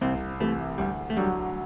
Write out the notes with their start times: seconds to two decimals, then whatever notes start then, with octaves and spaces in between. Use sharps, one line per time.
0.01 C2 C3 C4
0.40 C3 E3 A3
0.78 D2 G3
1.10 A3
1.17 D3 F#3 G3